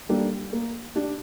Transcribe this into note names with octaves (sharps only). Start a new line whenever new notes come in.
G3 A#3 D4 A4
A#3
D4 G4 D5